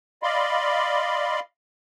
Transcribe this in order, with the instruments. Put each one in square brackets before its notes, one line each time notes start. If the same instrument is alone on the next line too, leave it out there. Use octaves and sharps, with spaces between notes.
[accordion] D5 D#5 F5 B5 C6